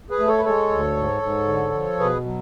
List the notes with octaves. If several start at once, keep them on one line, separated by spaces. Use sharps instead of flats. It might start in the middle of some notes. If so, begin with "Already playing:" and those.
G#4 B4
A3
A4 C#5
B4
G#3 A4 C#5
D2
G#2
G#2
D3
F3
B2 G#4 B4
F#3